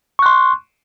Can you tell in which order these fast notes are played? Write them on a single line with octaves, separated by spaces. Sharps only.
C#6 F#6 C6